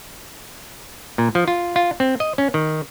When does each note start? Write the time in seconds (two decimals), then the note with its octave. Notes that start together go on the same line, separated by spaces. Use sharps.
1.18 A#2
1.35 F3
1.48 F4
1.76 F4
2.00 C4
2.20 D#5
2.38 C#4
2.54 D#3